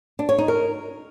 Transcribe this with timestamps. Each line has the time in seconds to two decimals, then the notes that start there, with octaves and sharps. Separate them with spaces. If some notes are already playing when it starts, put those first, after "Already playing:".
0.19 D4
0.29 C#5
0.38 D#4
0.48 A#4